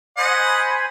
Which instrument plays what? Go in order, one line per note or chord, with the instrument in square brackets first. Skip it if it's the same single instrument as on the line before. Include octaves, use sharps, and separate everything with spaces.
[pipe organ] C5 G#5 B5 [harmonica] D#5 F#5